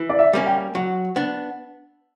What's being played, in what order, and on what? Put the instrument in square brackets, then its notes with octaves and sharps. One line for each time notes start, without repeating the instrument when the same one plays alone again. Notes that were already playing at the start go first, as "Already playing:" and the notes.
Already playing: [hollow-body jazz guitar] E3
[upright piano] D5
E5
[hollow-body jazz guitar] G3 A#3 C#4
[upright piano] G5
[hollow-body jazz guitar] F#3 [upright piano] F#5
[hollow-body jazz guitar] B3 D4